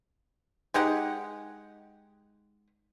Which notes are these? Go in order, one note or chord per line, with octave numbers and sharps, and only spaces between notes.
G#3 D#4 G4 F#5